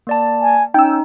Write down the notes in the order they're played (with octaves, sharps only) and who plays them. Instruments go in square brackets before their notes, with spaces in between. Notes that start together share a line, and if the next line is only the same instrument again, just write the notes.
[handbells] A#3 D5 A5
[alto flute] G#5
[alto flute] C#4 [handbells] D#4 [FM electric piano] G5 E6